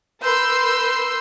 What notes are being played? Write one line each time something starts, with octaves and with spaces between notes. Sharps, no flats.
A#4 B4 C6 E6 G6